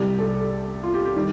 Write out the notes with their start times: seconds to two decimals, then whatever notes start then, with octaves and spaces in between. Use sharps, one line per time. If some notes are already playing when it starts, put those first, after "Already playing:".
Already playing: C2 C3 G3 G4
0.19 A4
0.83 F4
0.94 G4
1.05 G4
1.16 D#3 G3